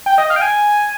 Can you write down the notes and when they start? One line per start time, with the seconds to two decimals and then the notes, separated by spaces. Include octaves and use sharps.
0.06 G5
0.18 D#5
0.30 F5
0.36 G5
0.41 G#5